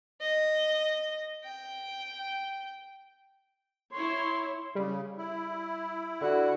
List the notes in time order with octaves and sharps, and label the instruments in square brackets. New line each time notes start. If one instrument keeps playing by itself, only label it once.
[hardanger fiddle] D#5
G5
[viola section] E4 C#5 [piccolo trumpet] C6
[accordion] C#3 [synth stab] G3
[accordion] E4
[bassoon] D3 [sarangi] F#4